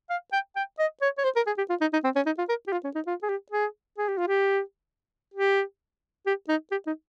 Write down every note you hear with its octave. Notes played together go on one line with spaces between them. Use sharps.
F5
G5
G5
D#5
C#5
C#5
C5
A#4
G#4
G4
F4
D#4
D#4
C4
C#4
D#4
F4
A#4
G4
F4
C#4
D#4
F4
G#4
G4
G#4
G#4
G4
F4
G4
G4
G4
D#4
G4
D#4